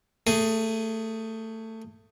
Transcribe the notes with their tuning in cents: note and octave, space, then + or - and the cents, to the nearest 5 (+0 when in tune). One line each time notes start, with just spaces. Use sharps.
A3 +20 G#4 +0